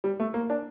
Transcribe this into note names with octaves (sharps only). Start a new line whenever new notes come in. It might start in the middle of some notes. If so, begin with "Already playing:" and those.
G3
A3
A#3
D4